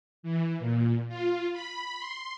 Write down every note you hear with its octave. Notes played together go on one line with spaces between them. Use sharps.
E3
A#2
F4
B5
C6